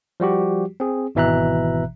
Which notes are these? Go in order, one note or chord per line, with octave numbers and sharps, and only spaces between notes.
F3 G3 F#4 G4
C4 G#4
G#1 B2 E3 E5 A#5 F#6